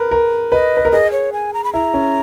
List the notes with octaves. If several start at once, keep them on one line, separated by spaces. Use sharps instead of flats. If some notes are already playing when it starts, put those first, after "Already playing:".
Already playing: A#4 B4
A#4
B4 D#5
B4
A#4
G#4 D#5
C#5
G#5
A#5
B5
E4 A#5
C#4